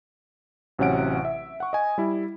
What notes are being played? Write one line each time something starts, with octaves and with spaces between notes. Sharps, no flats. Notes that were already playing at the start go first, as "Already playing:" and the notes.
A1 C3 F#3 C#4 F#5 D7
E5
F#5 C#6
D#5 G#5
G3 E4